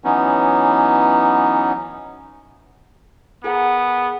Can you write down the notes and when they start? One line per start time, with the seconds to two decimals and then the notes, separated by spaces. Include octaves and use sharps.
0.04 E3 F#3 B3 C#4 D#4
3.44 B3 G#4 A#4 F#5